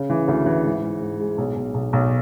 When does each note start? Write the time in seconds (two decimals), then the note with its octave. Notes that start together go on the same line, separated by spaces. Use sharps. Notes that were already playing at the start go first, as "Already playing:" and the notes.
Already playing: C#3
0.10 E3
0.28 D2
0.46 E3
0.65 G#2
0.83 G#2
1.01 G#2
1.20 G#3
1.38 B1
1.56 B1
1.74 B1
1.93 B1